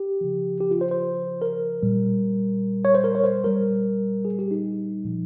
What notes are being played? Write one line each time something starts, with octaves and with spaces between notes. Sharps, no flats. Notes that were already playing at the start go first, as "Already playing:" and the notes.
Already playing: G4
C#3 F3
G4
F4
C5
C5
A#4
A#2 G3
C#5
C5
A#4
C#5
C5
A#2 G3 A#4
G#4
G4
D#4
A#2 F3